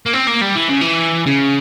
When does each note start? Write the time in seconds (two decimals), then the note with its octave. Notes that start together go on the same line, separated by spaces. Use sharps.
0.06 A#3
0.14 C4
0.27 A#3
0.41 G3
0.56 E3
0.69 C#3
0.81 E3
1.26 C#3